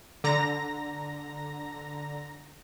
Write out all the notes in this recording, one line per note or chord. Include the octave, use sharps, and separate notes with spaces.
D3 A#5 A#6